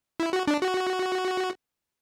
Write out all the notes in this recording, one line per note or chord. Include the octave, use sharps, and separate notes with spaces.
E4
F#4
D4
F#4